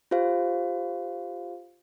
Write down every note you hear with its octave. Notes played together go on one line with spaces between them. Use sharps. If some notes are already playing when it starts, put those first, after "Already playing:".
F4 G4 C5 F5